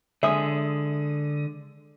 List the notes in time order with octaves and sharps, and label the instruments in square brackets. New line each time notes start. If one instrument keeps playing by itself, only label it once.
[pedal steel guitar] D3 D#6 [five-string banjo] G#3 E5